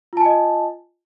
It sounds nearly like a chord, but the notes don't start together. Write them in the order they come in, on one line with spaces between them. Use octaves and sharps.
F4 A5 G#5 D#5